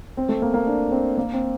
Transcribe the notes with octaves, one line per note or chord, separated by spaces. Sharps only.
C4
A3
A#3
A#3
D4
C4
A#3
C4